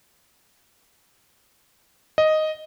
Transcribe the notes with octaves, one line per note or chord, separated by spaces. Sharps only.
D#5